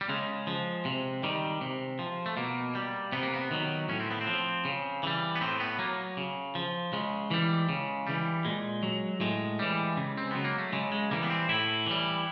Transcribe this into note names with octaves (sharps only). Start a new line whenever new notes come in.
G3
C#3 G#3
F3
C3
D#3 G3
C3
F3
A3
B2 A#3
G3
C3 B3
A#3
B3
D#3 F#3
A2 C#4
C4
B3
C4
F3
C#3
E3 G3
B3
A2 C4
B3
F#3 A#3
C#3
F3
C#3 G#3
E3 G3
C#3
E3 G3
A#2 G#3
F#3
A2 G#3
E3 G3
C#3
C4
F#3 B3
A#3
A3
C#3 G#3
G#3
E3 G3 A#3
B3
C4
A2 E4
E3 G3